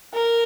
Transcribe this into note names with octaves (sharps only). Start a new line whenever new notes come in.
A#4